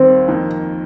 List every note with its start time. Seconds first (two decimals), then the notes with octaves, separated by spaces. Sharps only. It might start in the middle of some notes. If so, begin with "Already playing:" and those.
Already playing: D#2 D#3 G3 C4
0.28 F2 D#3 A#3